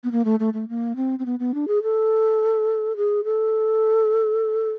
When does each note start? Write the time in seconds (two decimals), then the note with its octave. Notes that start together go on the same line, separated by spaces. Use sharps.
0.04 B3
0.12 A#3
0.25 A3
0.40 A3
0.54 A3
0.69 A#3
0.96 C4
1.19 C4
1.26 B3
1.40 B3
1.54 D4
1.68 G#4
1.83 A4
2.96 G#4
3.24 A4